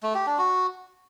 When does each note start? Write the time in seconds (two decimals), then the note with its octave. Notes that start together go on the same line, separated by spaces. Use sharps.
0.03 A3
0.15 G4
0.26 D4
0.38 F#4